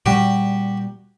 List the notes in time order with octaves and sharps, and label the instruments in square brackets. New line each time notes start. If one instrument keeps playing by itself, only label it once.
[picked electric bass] A#2 G3 [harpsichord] F#4 G4